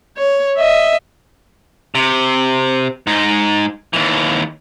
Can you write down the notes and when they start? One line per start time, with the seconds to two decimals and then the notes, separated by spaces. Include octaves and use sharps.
0.18 C#5
0.58 D#5 E5
1.95 C3
3.07 G#2 D#4
3.93 D#2 E3